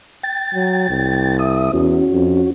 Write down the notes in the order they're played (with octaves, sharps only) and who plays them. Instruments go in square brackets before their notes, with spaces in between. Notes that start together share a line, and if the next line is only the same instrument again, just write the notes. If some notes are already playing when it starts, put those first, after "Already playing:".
[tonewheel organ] G5 A6
[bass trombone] F#3
C2
[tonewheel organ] E5 D#6
[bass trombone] E2 [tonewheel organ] C#4 F#4
[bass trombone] F2